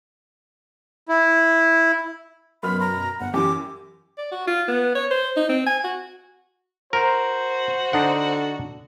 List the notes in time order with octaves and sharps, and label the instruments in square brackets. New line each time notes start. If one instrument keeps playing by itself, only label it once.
[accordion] E4
[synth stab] F#2 B2 [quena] B5 [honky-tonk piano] C6 F6
[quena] A#5 [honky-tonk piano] B5
[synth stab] G1 [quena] F#5
[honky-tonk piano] F#2 E3 [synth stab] G4 [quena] D6
[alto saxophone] D5
F#4
F4
B3
C#5
C5
D#4
C4
G#5
F#4
[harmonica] F#4 [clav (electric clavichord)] A#4 [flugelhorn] C5
[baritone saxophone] D3 [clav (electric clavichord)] D4 D#4 F#5